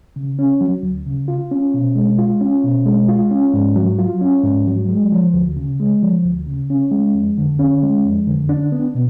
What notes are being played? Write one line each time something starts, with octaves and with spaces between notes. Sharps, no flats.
C#3
C#4
F#3
D2
C#3
F4
C#4
B2
G#3
F4
C#4
B2
G#3
F4
C#4
G#2
F#3
F4
C#4
G#2
F#3
G#3
F3
D2
C#3
G#3
F3
D2
C#3
C#4
G#3
F2
D3
C#4
G#3
F2
D3
D4
B3
B2